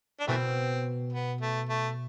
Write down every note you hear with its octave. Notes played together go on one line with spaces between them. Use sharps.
D4
B2 E3 A3 C4
B3
A3
A3